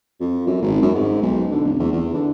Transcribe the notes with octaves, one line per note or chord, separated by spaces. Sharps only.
F2
F#2
G#1
F#2
G#2
B1
D3
F1
E2
E2
D3